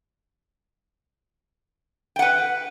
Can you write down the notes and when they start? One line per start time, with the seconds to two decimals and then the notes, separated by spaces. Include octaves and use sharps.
2.16 G5
2.19 F#5
2.22 B4